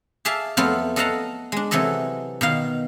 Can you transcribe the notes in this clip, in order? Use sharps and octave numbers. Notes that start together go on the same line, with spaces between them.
G#4 D5 E5 F5 A5
F2 F#3 A3 B3 F4 A4
A4 D#5 F5 F#5 A5 A#5
G#3 D4
C3 E3 F#3 A4 D#5
B2 D#3 F5